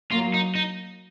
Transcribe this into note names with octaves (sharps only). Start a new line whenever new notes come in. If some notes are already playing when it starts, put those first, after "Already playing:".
F#3 A#3 F4
D#4
D#4